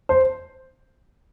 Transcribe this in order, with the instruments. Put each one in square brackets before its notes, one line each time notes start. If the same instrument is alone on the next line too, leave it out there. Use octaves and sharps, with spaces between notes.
[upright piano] C5